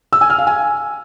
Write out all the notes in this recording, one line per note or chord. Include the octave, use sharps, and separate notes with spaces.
E6
G#5
F6
F5
G#5